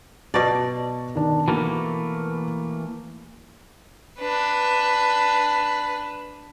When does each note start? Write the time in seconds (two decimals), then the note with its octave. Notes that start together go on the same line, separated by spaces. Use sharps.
0.34 B2 D5 A5 C#6 A#6
1.15 D#3 D4
1.48 E3 A3 A#3 F#4
4.19 D4 B4